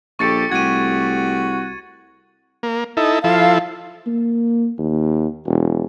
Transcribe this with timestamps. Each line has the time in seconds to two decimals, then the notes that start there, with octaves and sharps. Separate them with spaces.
0.19 A#1 G4 A4 C#6 A6 C#7
0.52 C2 A3 F#4 G4 G#6 D#7
2.63 A#3
2.97 D#4 E4 A4
3.24 F3 E4 A4 F5
4.07 A#3
4.78 D#2
5.46 E1